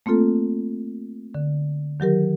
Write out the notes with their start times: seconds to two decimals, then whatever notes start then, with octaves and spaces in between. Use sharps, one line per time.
0.06 A3 A#3 C4 F4 A4
1.34 D3
2.00 D#3 F#3 G4 A#4